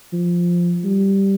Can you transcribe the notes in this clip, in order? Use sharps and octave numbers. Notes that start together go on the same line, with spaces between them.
F3
G3